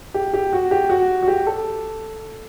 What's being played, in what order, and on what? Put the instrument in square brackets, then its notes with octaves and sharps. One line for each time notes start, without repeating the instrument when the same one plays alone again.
[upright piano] G4
G4
F#4
G4
F#4
F#4
G4
A4